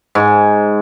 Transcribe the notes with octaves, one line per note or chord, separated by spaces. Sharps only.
G#2